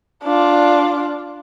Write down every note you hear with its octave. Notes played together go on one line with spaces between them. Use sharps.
D4 F4